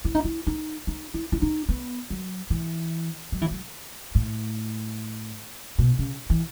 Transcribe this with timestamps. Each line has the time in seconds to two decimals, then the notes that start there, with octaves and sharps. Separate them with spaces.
0.05 E4
0.15 D#4
0.25 E4
0.47 D#4
0.87 D#4
1.14 E4
1.32 E4
1.42 D#4
1.69 B3
2.10 F#3
2.50 E3
3.32 F#3
3.41 E3
3.51 F#3
4.15 A2
5.79 B2
5.99 C#3
6.30 E3